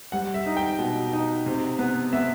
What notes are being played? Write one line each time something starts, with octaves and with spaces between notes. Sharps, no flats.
G3 F#5
E5
D#4
G5
B2
D#4
C3
B3
B3 E5